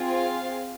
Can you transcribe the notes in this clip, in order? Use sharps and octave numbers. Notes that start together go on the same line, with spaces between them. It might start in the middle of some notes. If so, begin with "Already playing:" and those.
Already playing: C4 F4 G#4
F5